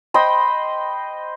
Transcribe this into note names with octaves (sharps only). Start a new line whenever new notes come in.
C5 D#5 G5 B5